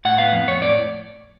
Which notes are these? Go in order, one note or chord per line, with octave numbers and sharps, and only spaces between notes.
A2 F#5
B3 F5
F2
F2 C#5
A2 D5